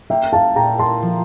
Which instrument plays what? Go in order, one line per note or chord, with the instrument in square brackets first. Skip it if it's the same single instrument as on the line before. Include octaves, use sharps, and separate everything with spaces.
[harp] A#3 [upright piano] E5 G5
[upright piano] F5 A5
[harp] A#2 [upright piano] G5 A#5
[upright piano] A5 C6
[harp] F3